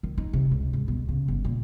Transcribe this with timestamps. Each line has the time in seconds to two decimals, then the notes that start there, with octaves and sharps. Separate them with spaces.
0.03 D#3
0.18 D#4
0.33 C3
0.51 C#2
0.73 G#2
0.88 B2
1.09 C#3
1.28 G1
1.45 A#2